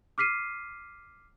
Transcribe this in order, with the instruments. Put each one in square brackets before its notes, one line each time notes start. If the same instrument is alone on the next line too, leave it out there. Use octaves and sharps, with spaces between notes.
[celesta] D6 F6 B6 C7 D#7